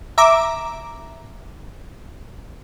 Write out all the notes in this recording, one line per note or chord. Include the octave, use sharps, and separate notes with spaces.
E5 A#5 D6